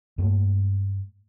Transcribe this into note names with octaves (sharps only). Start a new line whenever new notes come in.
G2 A3 A#3